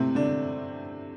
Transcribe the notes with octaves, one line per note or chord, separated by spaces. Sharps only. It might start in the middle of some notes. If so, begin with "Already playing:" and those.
Already playing: A2 C3 A3 C4
D3 D4